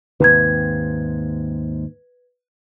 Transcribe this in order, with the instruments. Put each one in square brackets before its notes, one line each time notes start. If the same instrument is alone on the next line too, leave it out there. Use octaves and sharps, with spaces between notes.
[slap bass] D#2 G#2 C3 [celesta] B4 G#6